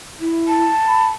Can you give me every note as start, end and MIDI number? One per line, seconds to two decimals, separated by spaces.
0.20 0.66 64
0.48 1.11 81
0.87 1.07 83